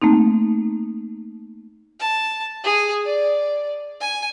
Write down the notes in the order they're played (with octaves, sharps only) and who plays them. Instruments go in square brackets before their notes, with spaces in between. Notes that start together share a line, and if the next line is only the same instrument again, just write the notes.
[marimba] A3 A#3 C4 D#4
[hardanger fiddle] A5
G#4
D5
G#5